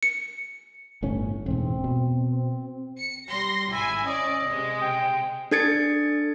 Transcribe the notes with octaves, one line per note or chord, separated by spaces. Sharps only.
C#7
G1 A2 C#4
E1 G#2 C4
B2
C4
C#7
G3 C6 A#6
G#1 E4 G#5
C#4 D5 D#5
C3 G#3
G5
D4 A4 G#6 A6 C#7